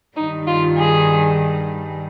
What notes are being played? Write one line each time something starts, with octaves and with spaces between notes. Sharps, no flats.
G2 D#3 G3 D#4
F4
G#4